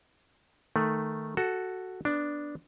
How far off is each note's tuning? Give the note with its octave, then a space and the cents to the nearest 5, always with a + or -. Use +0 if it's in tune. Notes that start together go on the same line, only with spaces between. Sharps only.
D#3 -5 A3 +0
F#4 +5 A4 +0
B3 +0 D4 +0